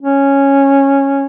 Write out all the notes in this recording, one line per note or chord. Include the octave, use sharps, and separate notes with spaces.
C#4